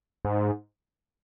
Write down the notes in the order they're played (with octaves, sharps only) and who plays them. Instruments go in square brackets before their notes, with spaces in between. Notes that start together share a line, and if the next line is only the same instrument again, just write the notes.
[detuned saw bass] G#2